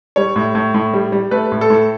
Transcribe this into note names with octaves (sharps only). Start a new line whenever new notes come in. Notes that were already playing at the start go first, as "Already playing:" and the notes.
G3 C#5
A2
A2
A2
G3
G3
A3 B4
A2
A4
A2